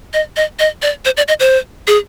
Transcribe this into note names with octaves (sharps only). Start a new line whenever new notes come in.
D#5
D#5
D#5
D5
C5
D5
D#5
C5
G#4